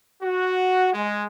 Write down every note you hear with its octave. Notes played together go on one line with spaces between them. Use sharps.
F#4
G#3